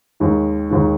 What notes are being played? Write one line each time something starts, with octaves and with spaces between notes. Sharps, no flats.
D#2 D#3 G#3
D#2 D#3 G#3